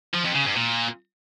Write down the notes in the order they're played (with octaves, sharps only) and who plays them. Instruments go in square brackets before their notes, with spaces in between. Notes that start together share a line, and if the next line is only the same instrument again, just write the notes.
[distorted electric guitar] F3
F2
C#3
G2
A#2